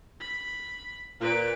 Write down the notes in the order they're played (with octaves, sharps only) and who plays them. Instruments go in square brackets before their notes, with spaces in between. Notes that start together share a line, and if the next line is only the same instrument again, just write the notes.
[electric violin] B5
[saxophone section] A#2 [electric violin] B4 D7